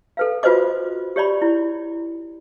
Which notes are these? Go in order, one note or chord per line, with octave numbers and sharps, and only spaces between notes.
A4 B4 F5
F4 F#4 B4 C5 D#5 D6
G4 C#5 D5 B5
E4